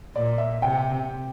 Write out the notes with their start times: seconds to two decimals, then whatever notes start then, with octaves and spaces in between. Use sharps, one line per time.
0.15 A#2 D5
0.38 E5
0.62 C3 G5